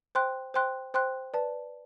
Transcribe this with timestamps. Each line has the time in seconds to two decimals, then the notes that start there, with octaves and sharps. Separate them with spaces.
0.15 C5 G5 C6 F#6
0.54 C5 G5 C6 F#6
0.94 C5 G5 C6 F#6
1.34 B4 D5 A5